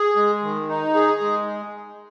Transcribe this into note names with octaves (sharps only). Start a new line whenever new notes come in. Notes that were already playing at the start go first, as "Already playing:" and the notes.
Already playing: G#4
G#3
D#3
D#4
G#4
G#3